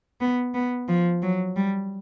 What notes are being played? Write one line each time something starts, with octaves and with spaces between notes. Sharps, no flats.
B3
B3
F3
F#3
G3